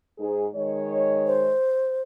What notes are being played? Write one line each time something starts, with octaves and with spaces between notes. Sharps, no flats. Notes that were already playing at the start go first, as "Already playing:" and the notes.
G#2 G#4
D#3 G#3 C#5
C5